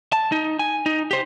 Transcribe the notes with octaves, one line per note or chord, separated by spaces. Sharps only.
A5
D#4
G#5
D#4
G4 C5